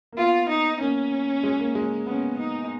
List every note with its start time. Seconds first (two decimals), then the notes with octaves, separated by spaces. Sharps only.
0.12 A#3
0.17 B3 F4
0.48 D#4
0.80 A#3 C#4
1.43 G#3
1.59 A#3
1.75 G#3
2.07 B3 C#4
2.38 D#4